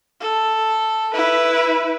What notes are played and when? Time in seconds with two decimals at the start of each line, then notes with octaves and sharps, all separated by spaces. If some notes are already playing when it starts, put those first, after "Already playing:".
0.21 A4
1.14 E4 B4